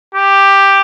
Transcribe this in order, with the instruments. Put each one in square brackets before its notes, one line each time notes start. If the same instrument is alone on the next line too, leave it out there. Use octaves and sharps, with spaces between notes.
[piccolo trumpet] G4